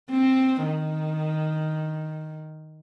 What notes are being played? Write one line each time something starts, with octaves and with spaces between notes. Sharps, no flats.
C4
D#3